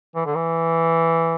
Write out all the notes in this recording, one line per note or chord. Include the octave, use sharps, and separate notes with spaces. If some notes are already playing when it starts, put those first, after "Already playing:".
E3
D3
E3